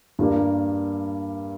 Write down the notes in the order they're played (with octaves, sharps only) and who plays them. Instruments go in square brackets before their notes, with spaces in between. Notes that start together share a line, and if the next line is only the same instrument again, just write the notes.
[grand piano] G2 G3 A#3